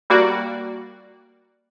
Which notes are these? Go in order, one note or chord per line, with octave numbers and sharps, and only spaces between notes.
G3 A#3 F#4 D5